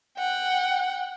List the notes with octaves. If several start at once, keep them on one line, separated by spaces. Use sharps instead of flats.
F#5 G5